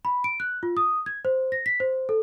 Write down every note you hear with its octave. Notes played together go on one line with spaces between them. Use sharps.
B5
D7
F#6
F4
D#6
G#6
C5
A#6
B6
C5
A4